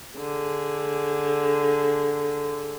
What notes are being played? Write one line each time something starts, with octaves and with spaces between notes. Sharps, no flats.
D3 G#4